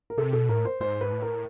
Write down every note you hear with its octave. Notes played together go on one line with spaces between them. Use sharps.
A#4
C3 A4
B2 A4
A2 A#4
C5
G#2 C5
B4
A2
A#4